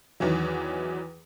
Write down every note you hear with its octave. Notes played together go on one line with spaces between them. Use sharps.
E2 D#3 E3 F#3